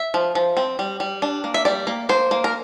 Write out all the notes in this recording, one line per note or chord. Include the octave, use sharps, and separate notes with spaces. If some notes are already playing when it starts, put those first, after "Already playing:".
Already playing: E5
F3
F3
C4
G3
G3
D4
A#3
E5
G3 D5
A#3
A#3 C5
A#3
A#4